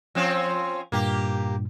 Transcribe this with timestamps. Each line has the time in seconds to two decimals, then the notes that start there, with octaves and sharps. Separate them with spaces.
0.15 F3 C4 C#4
0.92 G2 A#2 A#3 G4